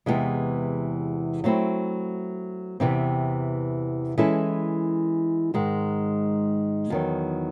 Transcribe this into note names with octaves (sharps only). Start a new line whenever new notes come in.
E2 C3 E3 G#3
F#3 A3 C4 E4
E2 C3 E3 C4
E3 G#3 C#4 E4 A4
G#2 D#3 G#3
E2 D#3 F#3